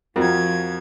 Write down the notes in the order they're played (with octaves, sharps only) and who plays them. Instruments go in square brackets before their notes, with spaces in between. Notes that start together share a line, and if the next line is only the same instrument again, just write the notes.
[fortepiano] F2 [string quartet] F3 G#6 [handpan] F4 F#4 A#4